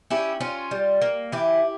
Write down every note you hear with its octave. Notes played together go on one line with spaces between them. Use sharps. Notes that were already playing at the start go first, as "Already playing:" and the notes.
C#4 E4 G4
C#4 F4
G3
A#3
E3 E4 G4